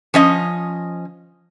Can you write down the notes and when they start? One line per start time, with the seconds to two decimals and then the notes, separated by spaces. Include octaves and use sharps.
0.14 F3 C#4 D#5